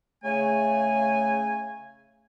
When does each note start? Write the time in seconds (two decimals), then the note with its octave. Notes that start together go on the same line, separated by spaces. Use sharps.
0.24 C#3 A3 G#5